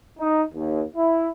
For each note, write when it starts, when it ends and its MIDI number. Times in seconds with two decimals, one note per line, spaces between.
0.19 0.43 63
0.53 0.82 39
0.96 1.27 64